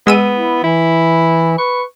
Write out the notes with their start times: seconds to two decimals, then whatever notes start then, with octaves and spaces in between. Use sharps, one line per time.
0.07 G#3 B3 E6 D#7
0.34 E4
0.64 E3 E4
1.58 B4 C#6